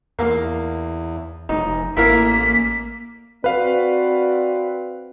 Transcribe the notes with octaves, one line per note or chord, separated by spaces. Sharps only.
E2 A#3 F5
F1 D#4
A1 A#3 E4 A#4 F5 B6
C4 F#4 B4 D5 F5